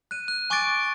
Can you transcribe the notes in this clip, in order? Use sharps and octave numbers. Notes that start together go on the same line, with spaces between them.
F#6 D#7
F#6
G#5 C#6 D6 F#6 A6 D7